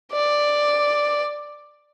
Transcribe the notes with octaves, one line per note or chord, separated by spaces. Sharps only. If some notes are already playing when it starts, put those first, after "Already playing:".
D5